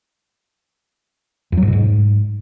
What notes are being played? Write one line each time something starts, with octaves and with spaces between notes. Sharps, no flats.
F2
F#3
G#2
B2
G#2